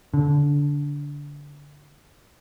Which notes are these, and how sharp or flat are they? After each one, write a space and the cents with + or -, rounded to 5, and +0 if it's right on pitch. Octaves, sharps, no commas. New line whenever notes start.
D3 -20